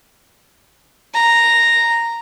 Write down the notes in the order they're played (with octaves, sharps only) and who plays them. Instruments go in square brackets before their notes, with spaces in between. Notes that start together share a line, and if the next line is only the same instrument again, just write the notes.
[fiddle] A#5